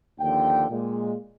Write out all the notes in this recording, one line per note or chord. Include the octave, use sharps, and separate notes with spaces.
D#2 D3 F3 G5
A#2 G#3